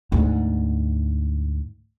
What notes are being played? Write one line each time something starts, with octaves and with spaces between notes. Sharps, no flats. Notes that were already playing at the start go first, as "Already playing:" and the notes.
D2 G#2